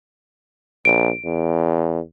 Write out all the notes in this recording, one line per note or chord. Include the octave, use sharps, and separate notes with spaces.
A#1 D7
E2